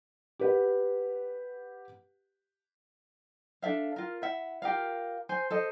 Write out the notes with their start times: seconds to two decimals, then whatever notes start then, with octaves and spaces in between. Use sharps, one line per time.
0.39 G4 B4 F#5
3.62 D4 A4 E5 F5
3.96 F4 A#4
4.22 E4 E5 F#5
4.62 F4 G4 A#4 F5
5.29 C5 G#5
5.51 A4 C5 D#5